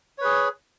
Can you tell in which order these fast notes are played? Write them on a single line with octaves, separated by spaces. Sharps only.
C#5 B4 G#4